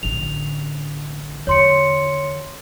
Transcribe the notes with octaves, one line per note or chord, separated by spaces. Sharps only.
A1 D3 F7
E2 D3 C#5 C6 C#7